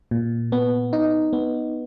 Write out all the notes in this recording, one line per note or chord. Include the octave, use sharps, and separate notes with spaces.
A#2
B3
D#4
B3